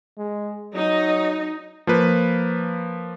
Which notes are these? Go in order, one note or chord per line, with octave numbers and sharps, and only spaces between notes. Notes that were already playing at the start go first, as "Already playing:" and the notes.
G#3
F#3 D#4
F3 A#3 B4